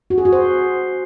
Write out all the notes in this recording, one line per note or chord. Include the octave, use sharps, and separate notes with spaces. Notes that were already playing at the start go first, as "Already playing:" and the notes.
F#4
G#4
F#4
C5